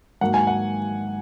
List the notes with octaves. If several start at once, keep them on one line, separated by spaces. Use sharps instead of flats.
G#2 D#3 F#3 A#3 F#5
G#5
F#5